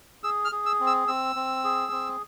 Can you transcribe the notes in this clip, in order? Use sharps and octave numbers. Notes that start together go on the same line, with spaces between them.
G#4 E6
F6
G#4
E6
C4
E6
C4 E6
C4
G#4
C4